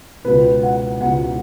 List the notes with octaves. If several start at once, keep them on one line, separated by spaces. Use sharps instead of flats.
C#2 B2 B4
F#5
C#2 B2 F#5